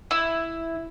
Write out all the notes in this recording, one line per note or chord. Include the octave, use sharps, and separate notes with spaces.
E4